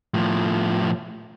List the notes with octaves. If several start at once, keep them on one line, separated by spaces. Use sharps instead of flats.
A2 F3